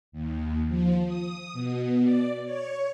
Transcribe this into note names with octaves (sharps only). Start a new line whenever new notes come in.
D#2
F3
D#6
B2
D5
C#5